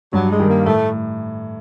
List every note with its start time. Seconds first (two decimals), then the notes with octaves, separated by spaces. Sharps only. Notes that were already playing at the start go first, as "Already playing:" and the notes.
0.13 G2 F#3
0.31 G#3
0.40 D#3 G3
0.49 A#3
0.66 A2 A3